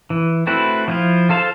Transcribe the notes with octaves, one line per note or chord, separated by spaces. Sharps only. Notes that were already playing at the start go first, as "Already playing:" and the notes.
E3
A3 C4 E4 F#4 B4
F3 E4 F4
F4 A4 C5 F5 A5